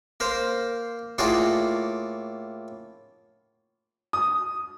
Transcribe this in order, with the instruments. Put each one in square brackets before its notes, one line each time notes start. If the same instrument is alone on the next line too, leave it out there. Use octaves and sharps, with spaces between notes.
[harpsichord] A#3 A#4 C5
A2 A#3 F4 F#4 G#4 D5
[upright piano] D#6